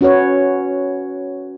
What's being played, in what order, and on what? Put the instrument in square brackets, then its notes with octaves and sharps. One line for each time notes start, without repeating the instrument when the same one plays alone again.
[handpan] C#4 F#4 B4 C#5